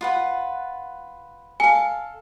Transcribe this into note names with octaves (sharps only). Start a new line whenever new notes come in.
F4 B4 F#5
A4 F5 G#5